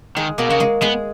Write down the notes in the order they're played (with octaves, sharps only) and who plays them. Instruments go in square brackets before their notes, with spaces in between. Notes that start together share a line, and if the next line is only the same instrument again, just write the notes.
[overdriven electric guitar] D#3 [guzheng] G#3 G#4
[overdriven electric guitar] B2 [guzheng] A#3 A#4
[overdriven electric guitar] C#3 [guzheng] F#4
[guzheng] G#3 G#4
[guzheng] G#3 G#4 [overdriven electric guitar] B3